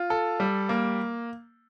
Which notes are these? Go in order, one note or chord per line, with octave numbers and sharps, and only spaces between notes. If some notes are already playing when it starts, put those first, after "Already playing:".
Already playing: F4
A4
G3
A#3